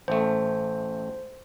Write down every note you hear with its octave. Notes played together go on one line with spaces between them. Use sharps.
A1 A3 C5